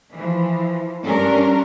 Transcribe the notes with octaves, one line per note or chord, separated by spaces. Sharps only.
E3 F3
G2 C#4 D4 A#4